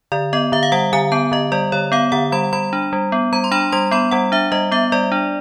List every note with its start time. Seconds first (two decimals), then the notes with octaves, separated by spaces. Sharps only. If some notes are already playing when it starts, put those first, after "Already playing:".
0.12 D3 D5
0.33 B3 D#5
0.52 D3 E5
0.63 F5
0.72 G3 F#5
0.93 D3 G#5
1.12 B3 A5
1.32 D3 D#5
1.52 G3 D5
1.72 D3 C#5
1.92 B3 F5
2.12 D3 F#5
2.32 G3 B5
2.53 G3 B5
2.73 D4
2.93 G3
3.12 B3
3.32 G3 A#5
3.44 C6
3.52 D4 B5
3.72 G3 C6
3.91 B3 B5
4.11 G3 F#5
4.32 D4 E5
4.52 G3 D#5
4.72 B3 E5
4.92 G3 D5
5.12 D4